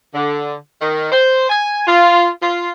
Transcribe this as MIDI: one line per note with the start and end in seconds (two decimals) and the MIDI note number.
0.14 0.55 50
0.81 1.10 51
1.12 1.49 72
1.49 1.82 80
1.87 2.29 65
2.42 2.72 65